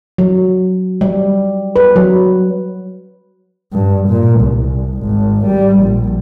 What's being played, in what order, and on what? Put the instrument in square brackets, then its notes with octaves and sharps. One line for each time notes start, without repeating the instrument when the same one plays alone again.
[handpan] F#3
G3
B4
F#3
[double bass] G2
A#2
C2
G#1
G3
A#1